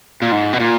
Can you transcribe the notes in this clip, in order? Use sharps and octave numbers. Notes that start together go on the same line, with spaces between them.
A#2
G#2
B2
A#2